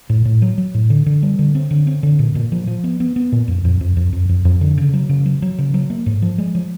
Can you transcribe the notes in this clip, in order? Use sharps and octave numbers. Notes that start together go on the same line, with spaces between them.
A2
A2
F#3
F#3
A2
D3
D3
G3
D3
C4
D3
C4
D3
A#2
A#2
F3
F3
B3
B3
B3
A#2
F2
F2
F2
F2
F2
F2
F2
D3
C#3
F#3
C#3
F#3
F#3
C#3
F#3
A#3
G#2
F3
G#3
F3